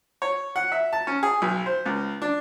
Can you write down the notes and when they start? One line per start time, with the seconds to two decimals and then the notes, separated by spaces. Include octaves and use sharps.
0.22 C#5
0.56 F#5
0.72 E5
0.93 A5
1.07 C#4
1.23 G#4
1.42 B1
1.66 C5
1.86 C#2
2.22 D4